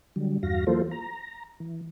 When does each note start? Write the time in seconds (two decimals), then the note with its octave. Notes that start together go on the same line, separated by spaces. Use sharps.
0.16 D3 F#3 G3
0.43 E2 G2 F#4 F5 A#6
0.67 E3 F#3 A#3 F4 A4 C5
0.91 A#5
1.60 E3